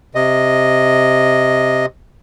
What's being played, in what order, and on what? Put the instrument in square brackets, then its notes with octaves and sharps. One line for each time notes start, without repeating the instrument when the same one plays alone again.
[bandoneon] C3 D#5